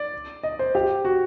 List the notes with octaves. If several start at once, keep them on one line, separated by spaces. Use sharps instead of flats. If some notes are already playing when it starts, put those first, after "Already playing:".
Already playing: D5
D#5
C5
G4
F#4